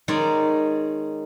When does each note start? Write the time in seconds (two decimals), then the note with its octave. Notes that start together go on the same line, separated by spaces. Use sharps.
0.08 D#3 G#3 C#4 D5